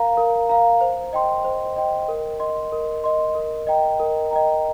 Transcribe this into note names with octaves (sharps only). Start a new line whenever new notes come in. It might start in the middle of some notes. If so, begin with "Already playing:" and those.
Already playing: A#4 F5 A#5
A#4
F5 A#5
C5
D#5 G5 C6
C5
D#5 G5 C6
A#4
D#5 C6
A#4
D#5 C6
A#4
D#5 G5 A#5
A#4
D#5 G5 A#5